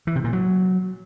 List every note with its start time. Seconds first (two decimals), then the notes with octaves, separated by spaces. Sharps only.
0.07 E3
0.16 C3
0.24 A#2
0.33 F#3